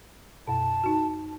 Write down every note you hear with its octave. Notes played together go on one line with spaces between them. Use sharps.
F#2 B2 A5
D#4 F#4